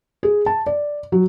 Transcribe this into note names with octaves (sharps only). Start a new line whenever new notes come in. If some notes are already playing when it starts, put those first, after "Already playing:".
G#4
A5
D5
F#3